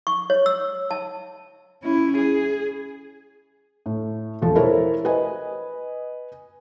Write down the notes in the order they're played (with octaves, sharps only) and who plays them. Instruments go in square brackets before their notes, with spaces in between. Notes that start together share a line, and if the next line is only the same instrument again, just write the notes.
[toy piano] C#6
C#5
E6
A5
[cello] C#4 E4
G#4
[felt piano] A2
E1 F3 A4
E4 A4 A#4 C5 C#5
B4 D#5 G#5